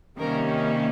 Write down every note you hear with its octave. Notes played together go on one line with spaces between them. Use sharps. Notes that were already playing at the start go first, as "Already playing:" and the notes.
C3 D#3 G3 A#3 C#4 A#4